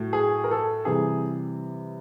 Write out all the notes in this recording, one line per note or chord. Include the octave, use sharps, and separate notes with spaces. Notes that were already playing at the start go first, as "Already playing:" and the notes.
Already playing: A2 F#3 A3
G#4
A#4
A4
C3 E3 G3 G#4